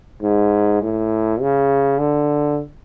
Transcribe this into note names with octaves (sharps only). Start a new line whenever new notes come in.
G#2
A2
C#3
D3